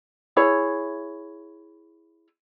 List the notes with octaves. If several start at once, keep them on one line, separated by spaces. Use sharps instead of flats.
E4 G#4 C#5